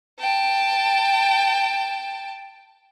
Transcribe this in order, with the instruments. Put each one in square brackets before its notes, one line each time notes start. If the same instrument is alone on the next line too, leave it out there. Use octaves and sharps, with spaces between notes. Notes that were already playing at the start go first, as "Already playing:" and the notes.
[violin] G5 A5